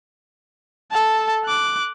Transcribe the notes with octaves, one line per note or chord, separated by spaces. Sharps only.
A4 A5
D6 F#6